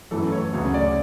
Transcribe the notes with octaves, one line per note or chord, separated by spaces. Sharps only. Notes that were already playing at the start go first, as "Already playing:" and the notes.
F#2 E3 A3 A4
C#5
D2 C#3 F#3 C#5
D5